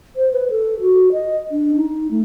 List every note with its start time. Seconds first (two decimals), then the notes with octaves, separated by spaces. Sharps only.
0.16 C5
0.33 B4
0.50 A4
0.81 F#4
1.12 D#5
1.51 D4
1.76 D#4
2.11 A3